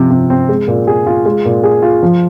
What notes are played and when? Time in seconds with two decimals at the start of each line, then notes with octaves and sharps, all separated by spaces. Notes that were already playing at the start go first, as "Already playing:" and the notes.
Already playing: C3 F3
0.11 C3
0.30 C4
0.49 G#3
0.68 A#2
0.87 G#4
1.07 F4
1.26 G#3
1.45 A#2
1.63 G#4
1.82 F4
2.03 F3